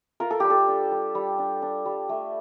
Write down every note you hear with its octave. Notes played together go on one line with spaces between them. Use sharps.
F4 A#4
A4
G3 G4
A4
D4
G3
G3
D4
D4
G3
A3